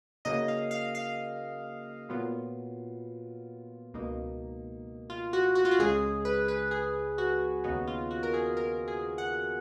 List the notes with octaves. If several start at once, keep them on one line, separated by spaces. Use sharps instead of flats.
C#3 F#3 A#3 D#4 D#5
F5
F5
F5
A#2 F#3 B3 F4
C#2 B2 A#3 D#4
F4
F#4
F#4
F4
F#4
C#2 C#3 G#3 G#4
B4
B4
G#4
F#4
D#2 C#3 F#3 B3 D#4 F#4
F4
F#4
A#4
G#4
A#4
G#4
F#5